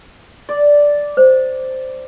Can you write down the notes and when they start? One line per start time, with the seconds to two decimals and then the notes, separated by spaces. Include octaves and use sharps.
0.49 D5
1.17 C5